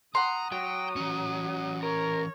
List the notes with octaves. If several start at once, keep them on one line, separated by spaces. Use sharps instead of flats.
F#5 A#5 C6 D#6
F#3 G5
E3 C#4
A#4 C#5